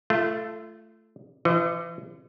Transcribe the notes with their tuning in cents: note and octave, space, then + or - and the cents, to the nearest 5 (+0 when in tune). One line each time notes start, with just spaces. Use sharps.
A3 +0 F4 -30
E3 +40 C5 -45 D#5 +0